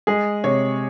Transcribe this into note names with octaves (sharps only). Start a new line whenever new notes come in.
G#3 G#4
C3 C#5